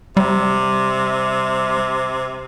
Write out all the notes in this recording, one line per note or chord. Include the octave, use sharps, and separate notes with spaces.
C3 G3